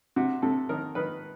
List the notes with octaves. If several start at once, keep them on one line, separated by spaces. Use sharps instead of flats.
C3 F#4
C3 A4
D#3 A#4
D#3 B4